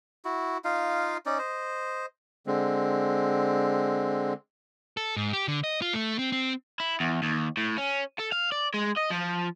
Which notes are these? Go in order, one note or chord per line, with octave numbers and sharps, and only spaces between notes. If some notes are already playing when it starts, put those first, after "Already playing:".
E4 F#4
D#4 F4 F5
C#4 D#4 D5
C5 D#5
D3 G#3 C4
A4
G#2
G4
D3
D#5
F4
A3
C4
C4
E4
E2
D#2
A2
C#4
A4
F5
D5
G#3
D#5
F3